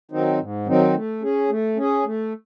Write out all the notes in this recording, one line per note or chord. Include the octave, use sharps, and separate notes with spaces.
D#3 F#3 C4 D#4
G#2
D#3 F#3 C4 D#4
A3
C#4 G#4
A3
C#4 G#4
A3